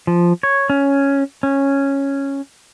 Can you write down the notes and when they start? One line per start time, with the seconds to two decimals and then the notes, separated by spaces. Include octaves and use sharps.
0.07 F3
0.43 C#5
0.70 C#4
1.43 C#4